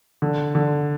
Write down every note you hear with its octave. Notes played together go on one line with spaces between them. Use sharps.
D3
D3